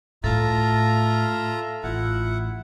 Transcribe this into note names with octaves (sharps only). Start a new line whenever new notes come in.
A2 F4 A4 E5 A5 A#5
A1 E4 F4 F#5